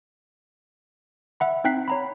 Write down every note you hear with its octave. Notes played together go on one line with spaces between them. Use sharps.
E5 F#5 B5
C4 D#4 G5 F#6 B6 C7
C#5 A#5 B5